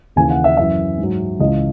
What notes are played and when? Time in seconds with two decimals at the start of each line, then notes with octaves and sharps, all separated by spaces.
0.16 D#2 C#3 E3 G#5
0.30 F#5
0.44 E5
0.57 F#2 E3 E5
0.98 G#2 F#3
1.39 C#2 C#3 E3 D#5